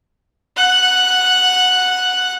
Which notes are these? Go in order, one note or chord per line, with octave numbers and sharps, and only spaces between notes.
F#5 F#6